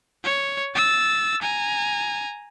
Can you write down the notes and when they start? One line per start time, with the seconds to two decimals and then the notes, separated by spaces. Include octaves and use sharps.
0.24 C#5
0.75 E6 A6
1.42 G#5 A#5